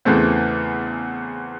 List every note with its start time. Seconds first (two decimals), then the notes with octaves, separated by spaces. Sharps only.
0.05 E2 C#3 E3 A3 C4